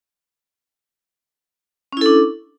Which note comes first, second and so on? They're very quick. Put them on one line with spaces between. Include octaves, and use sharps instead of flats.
C#4 E4 A4 D4